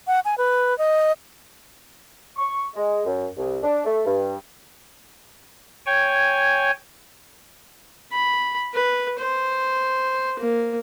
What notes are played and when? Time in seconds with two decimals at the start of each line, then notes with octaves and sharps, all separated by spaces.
0.07 F#5
0.25 G#5
0.38 B4
0.78 D#5
2.37 C#6
2.75 G#3
3.05 F#2
3.37 C2
3.62 D4
3.85 A3
4.05 G2
5.86 C#5 G5 G#5
8.12 B5
8.74 B4
9.19 C5
10.40 A#3